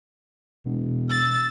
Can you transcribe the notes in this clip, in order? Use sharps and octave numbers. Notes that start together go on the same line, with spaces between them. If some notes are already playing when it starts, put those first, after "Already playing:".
E1 B2
E6 A6